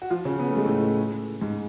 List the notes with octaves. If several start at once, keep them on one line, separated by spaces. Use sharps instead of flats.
F#4
F3 F4
C#3 C#4
B3
A3
G#3
A2 A3
G#2 G#3